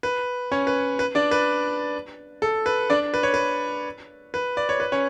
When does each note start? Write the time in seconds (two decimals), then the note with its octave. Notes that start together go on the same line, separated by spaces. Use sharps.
0.03 B4
0.52 C#4 C#5
0.67 B4
0.99 B4
1.15 D4 D5
1.31 B4
2.42 A4
2.66 B4
2.90 D4 D5
3.14 B4
3.23 C#5
3.34 B4
4.34 B4
4.57 D5
4.69 C#5
4.80 B4
4.92 C#4 C#5